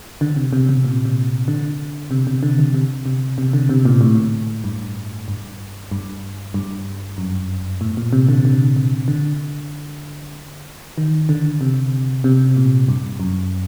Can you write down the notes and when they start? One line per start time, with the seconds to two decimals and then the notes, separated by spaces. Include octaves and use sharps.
0.21 D3
0.36 C3
0.53 C3
0.69 C3
0.84 A#2
1.05 C3
1.48 D3
2.11 C3
2.27 C3
2.43 D3
2.59 D3
2.74 C3
3.06 C3
3.38 C3
3.53 D3
3.69 C3
3.85 A#2
4.01 A2
4.64 G2
5.28 G2
5.91 G2
6.54 G2
7.18 F#2
7.81 A2
7.97 A#2
8.13 C3
8.29 D3
8.45 D3
8.76 C3
9.08 D3
10.98 D#3
11.29 D3
11.61 C3
12.24 C3
12.56 A#2
12.88 G2
13.20 F#2